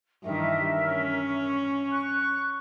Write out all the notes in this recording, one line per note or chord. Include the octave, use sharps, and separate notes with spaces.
G2 D#3 E3 A#4 E5
C#4
C#6 F#6